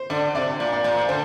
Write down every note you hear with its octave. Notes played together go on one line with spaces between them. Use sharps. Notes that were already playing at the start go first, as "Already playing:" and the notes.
Already playing: C5
D3 D5
C3 D5
A#2
D5
A#2
D3 C5